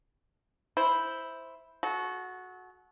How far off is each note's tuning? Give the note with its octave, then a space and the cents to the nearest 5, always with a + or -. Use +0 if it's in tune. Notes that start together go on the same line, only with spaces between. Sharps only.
E4 -5 C5 +0
F#4 -10 A4 -40